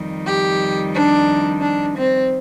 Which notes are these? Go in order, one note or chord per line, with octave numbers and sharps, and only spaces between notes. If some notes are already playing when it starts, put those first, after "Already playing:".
Already playing: F2 D#3 G3
G4
D4
D4
C4